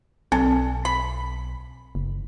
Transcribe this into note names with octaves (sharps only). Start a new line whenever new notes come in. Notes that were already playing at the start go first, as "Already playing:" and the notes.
B1 C4 A4
B5
F#1